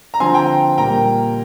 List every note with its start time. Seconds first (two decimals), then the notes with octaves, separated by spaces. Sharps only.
0.14 A#5
0.20 D3 F3 C4 G#5 C6
0.34 G5 A#5
0.78 A#2 G3 A#3 G5 A#5